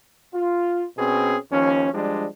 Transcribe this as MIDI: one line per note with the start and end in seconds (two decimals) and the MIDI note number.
0.34 0.85 65
0.98 1.37 47
0.98 1.37 60
0.98 1.37 61
0.98 1.37 68
1.51 1.92 39
1.51 1.92 53
1.51 1.92 61
1.93 2.26 53
1.93 2.26 55
1.93 2.26 56
1.93 2.26 62